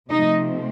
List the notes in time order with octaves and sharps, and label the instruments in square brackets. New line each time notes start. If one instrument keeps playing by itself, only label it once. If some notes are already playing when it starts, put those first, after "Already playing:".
[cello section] C3 F3 A3 C4 D#4 D#5